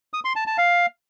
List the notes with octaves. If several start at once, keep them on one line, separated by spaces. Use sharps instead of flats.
D#6
C6
A5
A5
F5